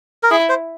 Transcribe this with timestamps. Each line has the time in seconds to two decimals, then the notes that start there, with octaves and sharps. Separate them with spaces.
0.23 A#4
0.31 E4 G#4
0.49 C5